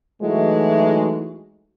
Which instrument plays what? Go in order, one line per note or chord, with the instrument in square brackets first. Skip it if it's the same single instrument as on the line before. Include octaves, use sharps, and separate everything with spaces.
[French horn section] E3 F#3 G#3 A3 D#4 F#4